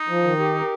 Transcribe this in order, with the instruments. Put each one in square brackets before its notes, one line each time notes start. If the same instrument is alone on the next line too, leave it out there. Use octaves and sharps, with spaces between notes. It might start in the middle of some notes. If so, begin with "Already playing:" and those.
Already playing: [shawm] D#4
[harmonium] F3
D#3
G4
A#4